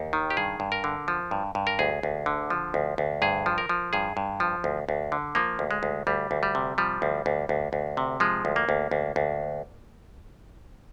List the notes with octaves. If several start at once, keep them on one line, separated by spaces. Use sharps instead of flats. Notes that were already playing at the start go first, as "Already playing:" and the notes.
Already playing: D#2
D#3
G4
G2 G#4
G2
A#4
D3
F3
G2
G2
A#4
D2 G#4
D2
D3
F3
D2
D2
G2 G#4
F3
A#4
F3
G2 G#4
G2
F3
D2
D2
D3
F3 A#3
D2
G#3
D2
D2 G3
D2
G3
C3
F3 G3
D2
D2
D2
D2
C3
F3 G#3
D2
A#3
D2
D2
D2